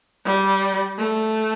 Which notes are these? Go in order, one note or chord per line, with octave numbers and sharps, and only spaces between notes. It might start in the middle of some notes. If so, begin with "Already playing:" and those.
G3
A3